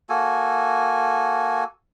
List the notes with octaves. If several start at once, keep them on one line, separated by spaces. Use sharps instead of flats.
A#3 F#4 A4 G#5